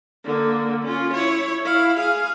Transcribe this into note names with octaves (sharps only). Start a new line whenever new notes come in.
D3 A#3
C#4 F4
E4 C#5
E4 F5
G#4 F5